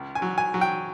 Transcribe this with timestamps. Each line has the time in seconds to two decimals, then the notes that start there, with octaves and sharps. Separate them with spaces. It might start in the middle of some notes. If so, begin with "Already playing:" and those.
Already playing: C#2
0.15 G#5
0.22 F#3
0.38 G#5
0.54 F#3
0.61 G5